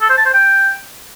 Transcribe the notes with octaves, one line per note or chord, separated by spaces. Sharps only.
A4
C5
A5
C5
G5